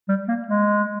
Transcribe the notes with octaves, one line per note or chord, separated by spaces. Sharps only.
G3
A#3
G#3